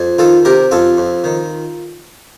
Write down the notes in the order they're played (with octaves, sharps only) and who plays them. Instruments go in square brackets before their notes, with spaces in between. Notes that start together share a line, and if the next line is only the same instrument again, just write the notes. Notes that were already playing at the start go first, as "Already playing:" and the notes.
Already playing: [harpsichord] F2
D#3 F4 A4
C3 G4 A#4
F2 F4 A4
F2
D#3